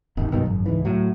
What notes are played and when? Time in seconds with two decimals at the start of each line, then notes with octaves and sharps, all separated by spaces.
0.17 D#1 G#1 D#3
0.32 B1 G2 B2 D#3
0.44 G#1 F#2
0.66 C#2 G#2 E3
0.85 A2 F#3